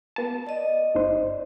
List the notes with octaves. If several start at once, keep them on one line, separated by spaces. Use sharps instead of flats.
B3 A5
D5 D#5
G1 D#4 C5